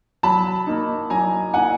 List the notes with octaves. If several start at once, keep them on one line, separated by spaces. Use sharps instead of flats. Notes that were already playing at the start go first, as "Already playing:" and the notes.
F#3 A5 B5
A#3 D#4
F#3 G#5 A#5
A#3 D#4 F#5 G#5